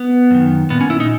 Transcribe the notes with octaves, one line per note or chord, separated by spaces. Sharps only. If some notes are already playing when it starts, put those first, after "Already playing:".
Already playing: B3
F#2 D#3
A#2 B3
C#4
E4
D#4